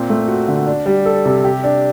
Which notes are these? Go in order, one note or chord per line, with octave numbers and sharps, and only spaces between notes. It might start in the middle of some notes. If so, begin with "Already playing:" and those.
Already playing: A#2 C4
A3
F#4
D3
D4
G3
A4
C3
G4
D4